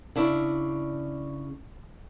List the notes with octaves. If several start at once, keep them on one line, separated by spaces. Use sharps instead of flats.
C#3 D4 E4